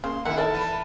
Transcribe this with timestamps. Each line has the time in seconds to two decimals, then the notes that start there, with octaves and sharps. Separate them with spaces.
0.04 C#3 A#3 C6
0.25 D3 D#3 A#3 E4 E5 F#5
0.38 A4 A#4 D5 A5
0.54 E3 B4